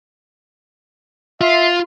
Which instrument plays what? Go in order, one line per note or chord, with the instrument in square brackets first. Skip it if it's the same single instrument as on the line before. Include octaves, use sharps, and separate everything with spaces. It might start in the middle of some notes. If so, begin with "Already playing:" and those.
[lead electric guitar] F4 [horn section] E5 C6